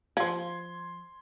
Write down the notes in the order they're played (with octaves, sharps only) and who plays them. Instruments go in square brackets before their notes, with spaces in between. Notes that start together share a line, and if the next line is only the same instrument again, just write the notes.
[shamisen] F3 [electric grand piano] C6 G#6